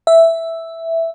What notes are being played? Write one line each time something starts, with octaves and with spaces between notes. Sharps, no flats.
E5